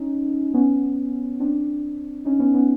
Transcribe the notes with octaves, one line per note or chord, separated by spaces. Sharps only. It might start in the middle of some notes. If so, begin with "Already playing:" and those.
Already playing: C#4 D#4
B3 C#4
C4 D4
C#4 D#4
B3 C#4
B3 C#4